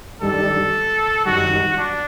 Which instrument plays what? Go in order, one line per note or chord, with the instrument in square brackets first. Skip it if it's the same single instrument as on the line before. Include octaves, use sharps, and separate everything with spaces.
[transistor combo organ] G2 D#3 G3 D4 [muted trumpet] A4
[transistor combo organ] F#2 D#3 G3 [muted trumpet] F#4
[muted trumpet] D4